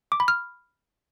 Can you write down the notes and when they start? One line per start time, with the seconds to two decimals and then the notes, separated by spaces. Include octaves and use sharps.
0.12 D6
0.20 B5
0.28 F6